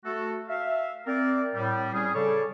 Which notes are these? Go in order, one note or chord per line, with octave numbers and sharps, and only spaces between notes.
A3 F#4 A4
E5 F5
C4 A#4 D5
A2 G3
G3 C#4 G#4
C#3 G3 A4 C#5 D5